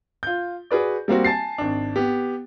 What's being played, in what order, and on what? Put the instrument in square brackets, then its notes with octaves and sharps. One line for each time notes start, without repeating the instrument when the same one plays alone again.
[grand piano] F4 G6
F#4 G#4 B4 D5
G3 A#3 C4 F#4
G#5 A5 A6 C7
G#1 D4
B3 G4